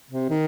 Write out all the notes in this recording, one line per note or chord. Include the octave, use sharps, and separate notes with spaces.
C3
D#3